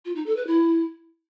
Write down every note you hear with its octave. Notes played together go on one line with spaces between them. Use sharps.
F4
D#4
A4
B4
E4